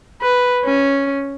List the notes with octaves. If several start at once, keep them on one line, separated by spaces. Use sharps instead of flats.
B4
C#4